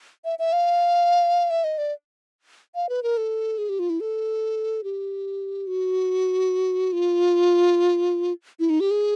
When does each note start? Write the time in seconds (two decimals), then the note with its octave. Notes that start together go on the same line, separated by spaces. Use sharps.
0.25 E5
0.39 E5
0.53 F5
1.50 E5
1.64 D#5
1.78 D5
2.75 F5
2.89 B4
3.03 A#4
3.17 A4
3.58 G#4
3.69 G4
3.79 F4
3.90 E4
4.00 A4
4.84 G4
5.67 F#4
6.93 F4
8.60 E4
8.70 D#4
8.80 G4
8.91 G#4